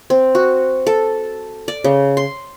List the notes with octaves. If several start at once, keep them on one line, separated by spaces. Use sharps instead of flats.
C4
F#4
A4
D5
C#3
C6